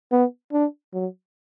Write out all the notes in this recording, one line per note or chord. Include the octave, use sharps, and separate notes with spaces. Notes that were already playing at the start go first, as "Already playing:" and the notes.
B3
D4
F#3